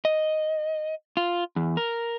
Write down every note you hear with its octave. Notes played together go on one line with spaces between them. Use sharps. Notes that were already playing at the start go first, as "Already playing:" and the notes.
D#5
F4
E2
A#4